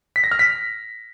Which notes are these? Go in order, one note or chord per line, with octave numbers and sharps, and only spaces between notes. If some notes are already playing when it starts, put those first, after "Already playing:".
B6
A#6
F6
B6